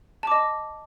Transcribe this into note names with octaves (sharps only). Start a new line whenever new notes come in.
D#5 A5 D6